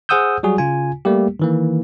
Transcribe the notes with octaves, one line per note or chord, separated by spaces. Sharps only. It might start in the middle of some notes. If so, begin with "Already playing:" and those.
G#4 C5 F#5 D#6 E6 G6
F#3 G3 F#4 G#4
C#3 F4 G#5
G3 A3 A#3 G4
D#3 E3 A#3